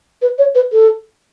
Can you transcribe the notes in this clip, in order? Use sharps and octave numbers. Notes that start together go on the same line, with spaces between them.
B4
C#5
B4
A4